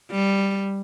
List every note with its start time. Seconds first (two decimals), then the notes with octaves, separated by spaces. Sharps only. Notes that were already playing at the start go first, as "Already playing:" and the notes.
0.11 G3